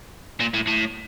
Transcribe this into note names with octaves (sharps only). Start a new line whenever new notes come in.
A#2
A2
A2